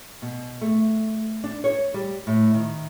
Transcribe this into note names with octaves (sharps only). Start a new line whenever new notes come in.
B2
A3
D4
C#5
G3
A2
D#3